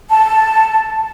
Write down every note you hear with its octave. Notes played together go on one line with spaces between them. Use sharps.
A5